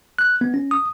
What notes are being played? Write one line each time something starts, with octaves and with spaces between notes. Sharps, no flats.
F#6
B3
C#4
D#6